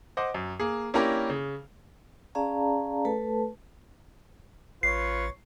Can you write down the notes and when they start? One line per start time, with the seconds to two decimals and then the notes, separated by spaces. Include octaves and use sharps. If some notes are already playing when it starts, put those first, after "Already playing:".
0.17 C5 D#5 F#5 D6
0.34 F#2
0.60 A#3 G#4
0.94 A#3 C#4 D4 E4 G4 A#4
1.30 C#3
2.35 C#4 G#4 D5 F5 A5 A#5
3.05 A3 A4 B4 A5
4.83 A1 F4 B4 C#5 C7